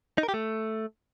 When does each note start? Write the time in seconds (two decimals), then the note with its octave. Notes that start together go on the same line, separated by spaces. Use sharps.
0.18 D#4
0.23 A#4
0.29 G4
0.34 A3